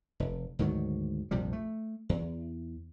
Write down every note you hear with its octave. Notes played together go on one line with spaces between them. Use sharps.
F1
D2 G#2 D#3 F#3
A#1 F2 C3 G3
A3
E2